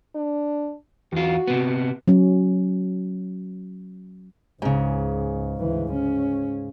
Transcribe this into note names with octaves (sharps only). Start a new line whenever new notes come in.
D4
E2 F4 F#4
C3 B3
F#3 C#4
C#2 G#2 C#3
D2 E3
C#4